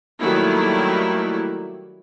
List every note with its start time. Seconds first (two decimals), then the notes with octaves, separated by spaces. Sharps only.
0.20 D#3 F#3 G3 A3 A#3 E4